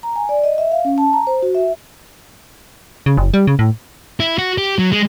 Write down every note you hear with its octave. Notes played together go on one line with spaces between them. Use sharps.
A#5
G#5
D5
D#5
E5
F5
C#4
A5
A#5
C5
F#4
E5
C#3
F#1
G3
C#3
A2
E4
F#4
G4
F#3
G#3